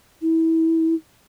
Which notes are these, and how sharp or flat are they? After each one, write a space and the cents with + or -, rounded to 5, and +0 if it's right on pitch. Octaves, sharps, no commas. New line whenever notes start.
E4 -25